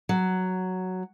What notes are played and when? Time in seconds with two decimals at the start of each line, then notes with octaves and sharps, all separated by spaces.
0.09 F#3